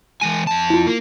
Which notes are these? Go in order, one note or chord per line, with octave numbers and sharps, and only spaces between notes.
E3 G#3 G#5 D#7
F2 A5
E4 F4
A#3